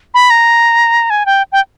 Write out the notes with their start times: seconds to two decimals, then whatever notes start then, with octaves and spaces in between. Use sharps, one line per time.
0.14 B5
0.30 A#5
1.10 G#5
1.26 G5
1.52 G5